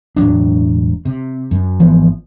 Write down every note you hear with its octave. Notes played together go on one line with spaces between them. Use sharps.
E1 A2 F#3 D4
C3
F#2
G#1 E3 F3 B3